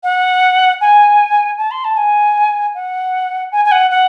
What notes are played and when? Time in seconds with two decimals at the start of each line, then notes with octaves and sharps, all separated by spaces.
0.03 F#5
0.81 G#5
1.58 A5
1.71 C6
1.84 A5
1.97 G#5
2.74 F#5
3.52 G#5
3.65 G#5
3.72 F#5
3.91 F#5